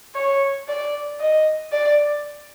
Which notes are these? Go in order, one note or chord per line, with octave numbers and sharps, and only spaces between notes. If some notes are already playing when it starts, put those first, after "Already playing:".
C#5
D5
D#5
D5